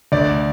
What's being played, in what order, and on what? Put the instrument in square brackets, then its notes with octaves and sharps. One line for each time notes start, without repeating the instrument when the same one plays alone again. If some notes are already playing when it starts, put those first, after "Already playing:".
[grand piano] D2 D5